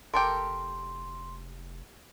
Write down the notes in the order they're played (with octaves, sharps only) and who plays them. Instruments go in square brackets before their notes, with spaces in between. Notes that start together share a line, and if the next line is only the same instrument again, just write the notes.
[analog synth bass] F1 [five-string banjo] G4 A4 A#4 [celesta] C6